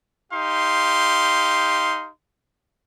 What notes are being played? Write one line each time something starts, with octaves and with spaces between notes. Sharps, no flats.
D#4 G4 F5 C6